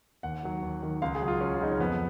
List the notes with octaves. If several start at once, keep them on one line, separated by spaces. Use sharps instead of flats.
D#2 F#5
D#3 F#3
D#2
D#3 F#3
C#2 F5
G#4
C#3 F#3
F4
C#2 C#4
F4
C#3 F#3 D#4
C#4
F2 B3